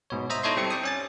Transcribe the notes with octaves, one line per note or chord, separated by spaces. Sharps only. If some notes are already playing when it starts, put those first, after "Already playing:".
G#2 B2 C#5
C5 D#5 E5 A#5 D#6
D#4 E4 A4 C#5 D#5 C6
G3 C4 A4 C#7
D5 G5 D#6
C#4 G#5 A6